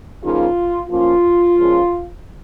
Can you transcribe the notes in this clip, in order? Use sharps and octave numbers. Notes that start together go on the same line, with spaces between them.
C#3 F3 A#3 D#4 F4
F3 A#3 C#4 F4
A#2 F3 G#3 C#4